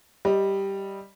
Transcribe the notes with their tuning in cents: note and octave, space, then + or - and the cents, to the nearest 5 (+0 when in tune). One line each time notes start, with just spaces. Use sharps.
G3 +0 D#5 +10